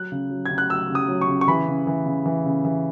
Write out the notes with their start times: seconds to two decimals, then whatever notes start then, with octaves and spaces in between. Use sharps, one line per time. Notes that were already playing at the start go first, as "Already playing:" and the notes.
Already playing: F#3 F#6
0.12 C#3
0.31 F#3
0.46 G#6
0.51 C#3
0.58 F#6
0.69 F#3 E6
0.90 C#3
0.95 D#6
1.08 F#3
1.21 C#6
1.28 C#3
1.41 C#6
1.48 E3 B5
1.68 C#3
1.87 E3
2.06 C#3
2.26 E3
2.46 C#3
2.65 E3